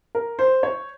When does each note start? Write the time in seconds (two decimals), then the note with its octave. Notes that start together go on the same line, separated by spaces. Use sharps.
0.15 A#4
0.39 C5
0.63 C#5